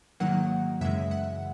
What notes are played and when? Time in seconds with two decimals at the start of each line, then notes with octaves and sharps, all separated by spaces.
0.20 G#2 D#3 F#3 A#3 F#5
0.81 F#2 C#3 E3 G#3 E5
1.11 F#5